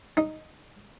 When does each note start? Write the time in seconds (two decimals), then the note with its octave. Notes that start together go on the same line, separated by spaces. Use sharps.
0.17 D#4